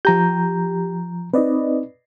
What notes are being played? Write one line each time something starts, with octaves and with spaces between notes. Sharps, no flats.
F3 G4 A#5 G6
C4 D#4 B4 D5 D#5